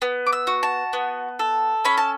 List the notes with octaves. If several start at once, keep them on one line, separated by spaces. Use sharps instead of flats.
B3
D6
E6
F#4
A5
B3
A4
C#4 B5
A5